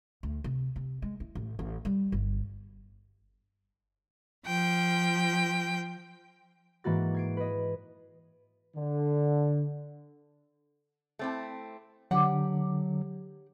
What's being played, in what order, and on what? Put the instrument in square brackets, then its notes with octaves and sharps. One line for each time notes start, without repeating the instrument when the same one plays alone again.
[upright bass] D2
C3
C3
G#3
E4
A1
A1
G3
G1
[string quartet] F3 G5
[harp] G#2 E3 A#3 F#4 A6
G#6 C7 D7
B4 D#5
[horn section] D3
[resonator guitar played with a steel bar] A3 C4 E4
[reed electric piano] D3 [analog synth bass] F#3 [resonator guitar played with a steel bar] G4 F#5